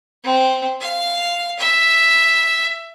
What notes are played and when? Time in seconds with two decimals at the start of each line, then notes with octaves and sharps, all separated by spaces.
0.23 C4
0.80 F5
1.59 E5